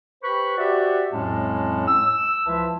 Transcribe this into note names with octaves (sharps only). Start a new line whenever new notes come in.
G4 B4 C5 B5 C#6
F#4 G4 C5 D5 E5 F#5
F2 A2 F#3 G#3 C#4 A5
E6
C#2 F3 E4 B4 E5 A5